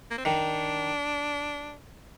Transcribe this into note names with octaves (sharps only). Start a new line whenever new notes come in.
A#3
C4
D#3 D4